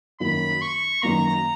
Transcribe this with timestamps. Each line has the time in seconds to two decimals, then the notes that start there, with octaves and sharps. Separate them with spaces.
0.20 F#2 D#3 F#3 A#3 B5
0.62 C#6
1.02 F#2 D#3 F#3 A#3 A#5